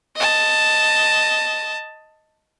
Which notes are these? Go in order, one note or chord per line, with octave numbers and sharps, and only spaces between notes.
D#5 A5